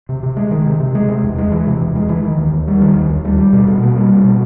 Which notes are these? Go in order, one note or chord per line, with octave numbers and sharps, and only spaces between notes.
C3
C3
G#3
D#3
C3
C3
G#3
C3
E2
G#3
E3
C3
E2
G#3
E3
D#3
D#2
D#2
G3
D#3
D#2
D#2
G3
G3
B2
B2
A#3
G3
B2
B2